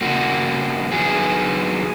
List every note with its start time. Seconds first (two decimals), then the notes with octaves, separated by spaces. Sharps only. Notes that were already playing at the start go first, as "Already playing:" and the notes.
0.01 C#3 F3 A#3 F#4
0.92 D#3 F#3 B3 G#4